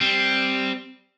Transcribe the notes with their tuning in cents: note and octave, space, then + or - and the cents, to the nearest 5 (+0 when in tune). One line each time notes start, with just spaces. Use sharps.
G3 +0 C4 +0